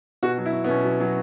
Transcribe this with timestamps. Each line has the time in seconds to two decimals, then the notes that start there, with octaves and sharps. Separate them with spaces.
0.23 B2 F#4
0.38 F#3
0.46 E4
0.53 B2
0.64 B3
0.69 B2 C#4
0.84 F#3
1.00 F#3